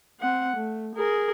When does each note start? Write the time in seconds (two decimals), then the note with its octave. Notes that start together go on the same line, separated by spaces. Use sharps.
0.21 C4 F#5
0.56 A3
0.95 G#4 A#4